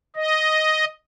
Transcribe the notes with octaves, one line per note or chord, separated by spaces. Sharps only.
D#5